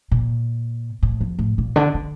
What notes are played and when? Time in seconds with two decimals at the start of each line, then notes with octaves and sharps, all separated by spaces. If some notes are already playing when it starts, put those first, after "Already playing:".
0.11 A#2
1.03 A2
1.21 F2
1.39 A2
1.58 A#2
1.76 D3
1.94 D3